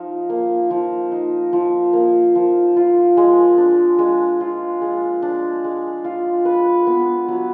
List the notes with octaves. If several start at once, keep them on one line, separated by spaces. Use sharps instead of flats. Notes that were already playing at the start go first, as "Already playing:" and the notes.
Already playing: F3 D#4
A#3
F3
D#4
F3
A#3
F3
F4
G#3
D4
G#3
F4
G#3
D4
G#3
F4
B4
B3
F#3